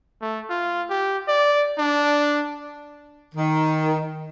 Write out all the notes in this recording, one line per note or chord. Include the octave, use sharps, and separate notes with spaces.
A3
F4
G4
D5
D4
D#3